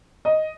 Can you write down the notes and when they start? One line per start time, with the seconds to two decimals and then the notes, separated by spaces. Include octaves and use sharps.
0.25 D#5